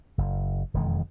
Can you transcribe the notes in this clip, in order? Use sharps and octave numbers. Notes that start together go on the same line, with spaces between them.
F#1
E1 F2 D#3 G#3